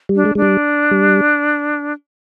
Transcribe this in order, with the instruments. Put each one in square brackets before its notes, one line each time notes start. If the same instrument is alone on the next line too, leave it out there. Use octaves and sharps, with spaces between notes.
[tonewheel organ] G3
[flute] D4
[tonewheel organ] G#3
[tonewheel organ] G#3 [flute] D4
[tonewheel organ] G3
G3